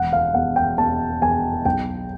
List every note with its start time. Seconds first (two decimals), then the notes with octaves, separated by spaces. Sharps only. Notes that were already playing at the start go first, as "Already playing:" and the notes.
Already playing: E1 F#5
0.13 F5
0.34 E2 F#5
0.56 G5
0.77 E2 A5
1.22 E2 G#5
1.65 B1 G5